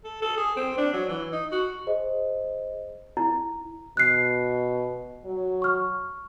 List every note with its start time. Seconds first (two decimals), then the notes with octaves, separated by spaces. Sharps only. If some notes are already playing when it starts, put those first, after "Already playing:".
0.04 A4
0.22 A4
0.37 G#4
0.56 C4
0.78 D4
0.93 F#3
1.09 E3
1.32 D#4
1.52 F#4
1.87 G#4 C5 D#5
3.17 E4
3.97 B2 F#6 C7
5.25 F#3
5.62 C#6 F6